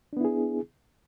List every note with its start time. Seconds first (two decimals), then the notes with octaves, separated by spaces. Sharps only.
0.13 D4
0.17 B3
0.21 E4
0.25 G#4